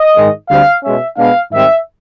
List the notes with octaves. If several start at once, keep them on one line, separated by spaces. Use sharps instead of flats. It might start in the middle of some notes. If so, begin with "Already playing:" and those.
Already playing: D#5
G#2 D#3 G#3
D2 D3 G3 C4 F5
B2 G#3 C#4 E5
B2 G#3 B3 D4 F5
G#2 D#3 G3 C4 E5